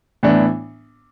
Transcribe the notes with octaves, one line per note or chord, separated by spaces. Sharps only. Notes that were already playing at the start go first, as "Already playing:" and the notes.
A2 E3 B3 D4